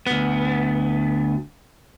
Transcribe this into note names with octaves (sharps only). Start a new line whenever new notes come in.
D2 B3